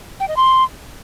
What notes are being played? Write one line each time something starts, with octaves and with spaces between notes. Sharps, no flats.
G5
D#5
C6